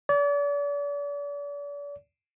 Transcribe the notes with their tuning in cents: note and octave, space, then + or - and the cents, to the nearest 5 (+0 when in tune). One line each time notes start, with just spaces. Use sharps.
D5 -40